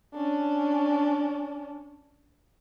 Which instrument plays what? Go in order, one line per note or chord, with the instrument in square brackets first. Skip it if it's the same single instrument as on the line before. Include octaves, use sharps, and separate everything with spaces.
[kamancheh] C#4 D4